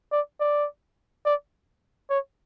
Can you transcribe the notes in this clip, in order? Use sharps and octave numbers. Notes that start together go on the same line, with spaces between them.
D5
D5
D5
C#5